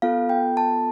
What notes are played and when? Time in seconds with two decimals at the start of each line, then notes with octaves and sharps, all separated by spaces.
0.02 B3 F4 A4 F5
0.29 G5
0.57 A5